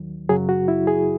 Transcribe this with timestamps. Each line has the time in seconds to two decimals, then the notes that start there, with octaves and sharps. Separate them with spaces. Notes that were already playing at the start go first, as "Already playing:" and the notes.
Already playing: D#2 D#3 F#3
0.29 F#2 C#3 F#3 G#4
0.49 F#4
0.68 E4
0.87 G#4